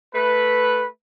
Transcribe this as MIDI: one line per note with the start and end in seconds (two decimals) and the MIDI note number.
0.14 0.85 57
0.14 0.85 71